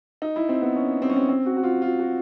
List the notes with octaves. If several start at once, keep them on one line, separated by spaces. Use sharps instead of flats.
D#4
E4
C4
B3
C#4
C4
C#4
C4
C4
F#4
F#4
F4
F4
F#4